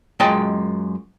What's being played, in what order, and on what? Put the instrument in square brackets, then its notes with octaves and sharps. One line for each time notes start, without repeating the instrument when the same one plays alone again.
[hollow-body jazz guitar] F#2 G#3 F4 D#5 G5 A5